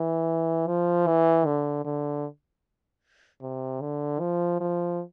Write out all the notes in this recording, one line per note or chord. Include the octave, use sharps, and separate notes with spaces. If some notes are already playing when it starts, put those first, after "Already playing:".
Already playing: E3
F3
E3
D3
D3
C3
D3
F3
F3